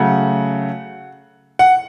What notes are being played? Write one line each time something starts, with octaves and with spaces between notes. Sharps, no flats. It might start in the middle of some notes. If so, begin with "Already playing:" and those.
Already playing: C#3 F#3 A3 F#5
F#5